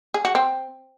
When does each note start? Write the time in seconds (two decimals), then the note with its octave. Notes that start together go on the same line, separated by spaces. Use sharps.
0.14 G#4
0.25 F#4
0.35 C4